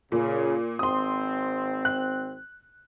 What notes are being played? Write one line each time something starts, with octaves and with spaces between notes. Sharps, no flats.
A#2 C#3
G#1 C4 C6 D#6
F#6